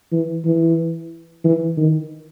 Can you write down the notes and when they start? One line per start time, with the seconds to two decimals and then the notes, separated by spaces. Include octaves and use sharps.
0.12 E3
0.45 E3
1.44 E3
1.77 D#3